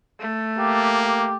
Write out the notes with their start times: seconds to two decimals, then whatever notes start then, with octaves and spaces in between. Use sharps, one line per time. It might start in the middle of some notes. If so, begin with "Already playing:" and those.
0.19 A3
0.58 A#3 G4
1.04 G4